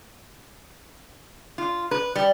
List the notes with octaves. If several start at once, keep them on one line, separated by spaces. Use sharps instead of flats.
F4
B4
G3